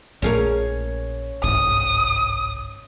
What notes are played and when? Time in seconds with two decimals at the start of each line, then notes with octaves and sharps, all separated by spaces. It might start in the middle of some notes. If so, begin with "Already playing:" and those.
0.22 A#1 A#2 A3 C#4 G#4 A#4
1.44 G1 C2 G#2 D#6